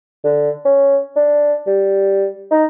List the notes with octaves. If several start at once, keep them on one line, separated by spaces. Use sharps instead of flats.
D3
C#4
D4
G3
D#4